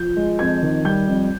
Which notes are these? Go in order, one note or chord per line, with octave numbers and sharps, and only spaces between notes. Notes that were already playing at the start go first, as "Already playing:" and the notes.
Already playing: F3 G6
G#3
F2 G#6
D#3
G3 G6
F2